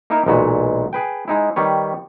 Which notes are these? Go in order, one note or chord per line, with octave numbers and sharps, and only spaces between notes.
A#3 D#4 E4 A#4 E5 F5
B1 E2 A#2 G#3 B3 F#4
G#4 B4 G5
G#3 D#4 E4
D#3 G3 B4 C#5